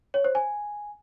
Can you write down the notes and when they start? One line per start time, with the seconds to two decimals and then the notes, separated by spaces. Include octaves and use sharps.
0.14 C#5
0.24 C5
0.35 G#5